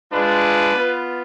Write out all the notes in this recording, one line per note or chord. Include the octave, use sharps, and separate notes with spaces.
G#3 D4 F4 B4
B3 F4